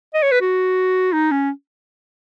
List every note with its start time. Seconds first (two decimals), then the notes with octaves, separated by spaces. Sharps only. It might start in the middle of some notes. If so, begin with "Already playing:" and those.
0.14 D#5
0.23 C#5
0.32 B4
0.41 F#4
1.13 D#4
1.31 C#4